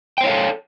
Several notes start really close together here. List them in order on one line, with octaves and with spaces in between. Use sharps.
G5 C5 C#5 F5 A4